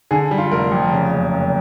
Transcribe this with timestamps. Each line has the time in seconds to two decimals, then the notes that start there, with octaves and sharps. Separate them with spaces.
0.11 D3 G#4
0.31 G3
0.38 F4
0.51 F1 A#4
0.72 F2
0.92 C#3
1.12 F#1
1.32 F#1